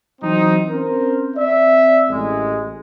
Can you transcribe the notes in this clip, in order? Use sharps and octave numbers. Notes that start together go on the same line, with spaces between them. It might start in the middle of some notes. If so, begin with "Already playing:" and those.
E3 F#3 C4 D#4
C4 C#4 A#4 C5
C4 D5 E5
A1 G#3